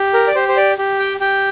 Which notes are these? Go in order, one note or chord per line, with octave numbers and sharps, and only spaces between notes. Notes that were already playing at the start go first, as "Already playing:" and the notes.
Already playing: G4
A#4
D5
G4 C5
C5
D5
G4
G5
G4 G5